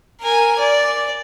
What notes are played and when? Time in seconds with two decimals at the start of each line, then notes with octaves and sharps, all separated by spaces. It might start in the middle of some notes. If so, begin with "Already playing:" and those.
0.21 A#4 G#5
0.59 D5